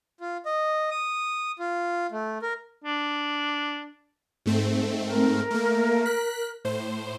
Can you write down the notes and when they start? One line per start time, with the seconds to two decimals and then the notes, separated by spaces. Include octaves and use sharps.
0.21 F4
0.46 D#5
0.91 D#6
1.59 F4
2.12 A3
2.42 A#4
2.84 D4
4.46 G#2 A3 C4
5.05 A#4
5.51 A3 A#3
6.06 F#6 B6
6.65 A2 C5